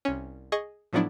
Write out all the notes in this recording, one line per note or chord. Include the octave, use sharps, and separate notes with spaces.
C2 C#4
G#4 D#5 C#6
A2 F3 F#3 B3 D4 E4